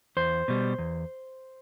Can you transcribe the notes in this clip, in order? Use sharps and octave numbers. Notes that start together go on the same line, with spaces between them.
E2 C5
B2 G3
E2